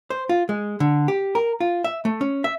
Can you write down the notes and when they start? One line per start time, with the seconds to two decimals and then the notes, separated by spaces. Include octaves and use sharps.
0.10 C5
0.29 F4
0.49 G#3
0.80 D3
1.08 G4
1.35 A#4
1.60 F4
1.84 E5
2.05 A3
2.21 C#4
2.44 E5